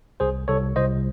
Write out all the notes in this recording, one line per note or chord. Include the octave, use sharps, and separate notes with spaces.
C2 G#4 C5
C2 A4 C#5
C2 C5 D#5